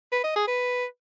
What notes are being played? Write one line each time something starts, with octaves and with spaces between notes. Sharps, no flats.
B4
D#5
G#4
B4